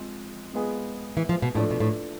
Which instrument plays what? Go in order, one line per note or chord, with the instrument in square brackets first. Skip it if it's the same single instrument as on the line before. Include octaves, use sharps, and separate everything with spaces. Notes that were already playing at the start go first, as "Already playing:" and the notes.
Already playing: [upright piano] F3 G#3 C4
G#3 B3 F4 G#4
[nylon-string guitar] E3
F3
B2
[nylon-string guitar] A2 [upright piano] F3 A3 D4 A4
[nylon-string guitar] B2
A2